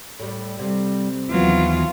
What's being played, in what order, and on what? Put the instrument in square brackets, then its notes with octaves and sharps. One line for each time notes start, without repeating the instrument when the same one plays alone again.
[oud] A2 G3
[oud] C3 [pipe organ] G3
[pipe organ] D#2 E3 B3 [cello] F#3 F4